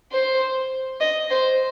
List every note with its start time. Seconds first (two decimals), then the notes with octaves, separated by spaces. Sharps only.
0.12 C5
1.00 D#5
1.30 C5